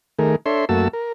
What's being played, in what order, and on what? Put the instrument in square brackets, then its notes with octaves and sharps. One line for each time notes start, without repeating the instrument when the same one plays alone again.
[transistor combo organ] D#3 A3 G#4 A#4
D4 A4 C#5 E5 C6
F#2 A3 A#3 F#4 A5 E6
A#4